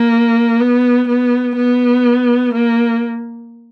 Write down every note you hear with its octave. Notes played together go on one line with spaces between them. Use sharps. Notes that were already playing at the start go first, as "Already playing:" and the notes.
Already playing: A#3
B3
B3
B3
A#3